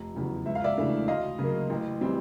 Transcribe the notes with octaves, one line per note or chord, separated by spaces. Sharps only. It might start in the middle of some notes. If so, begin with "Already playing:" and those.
Already playing: F1
E2 C#3 F#3
C#2 E5
F5
D5 E5
C#3 E3 A3 D4
D2 D#5 F5
C#3 F#3 A#3
A1
E3 G3 C4